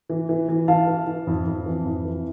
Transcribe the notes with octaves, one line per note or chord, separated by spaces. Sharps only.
E3
E3
E3
E3 F5 A5
E3
E3
F2
F2
E3
F2
E3